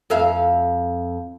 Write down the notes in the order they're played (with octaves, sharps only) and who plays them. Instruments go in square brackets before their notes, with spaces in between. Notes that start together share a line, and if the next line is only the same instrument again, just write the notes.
[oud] F2 E5 F5